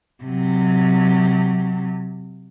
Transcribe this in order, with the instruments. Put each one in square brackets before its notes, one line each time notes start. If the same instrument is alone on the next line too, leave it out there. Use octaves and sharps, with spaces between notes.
[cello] C3 F#3